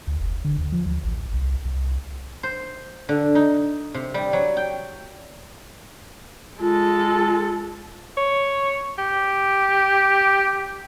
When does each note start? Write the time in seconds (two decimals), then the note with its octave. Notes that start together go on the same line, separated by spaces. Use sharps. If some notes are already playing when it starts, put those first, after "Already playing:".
0.07 D2
0.21 F1
0.45 D3
0.58 D#2
0.72 F3
0.86 D2
1.04 A1
1.33 C2
1.65 C2
2.43 C5
3.09 D3
3.35 D#4
3.94 C3
4.14 G3
4.33 F#3
4.57 G5
6.61 G#3 F4 A4
8.17 C#5
8.98 G4